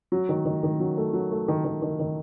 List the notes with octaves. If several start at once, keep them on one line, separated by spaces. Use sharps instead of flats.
F#3
D#3
D#3
D#3
F#3
A3
F#3
A3
D#3
D#3
D#3
D#3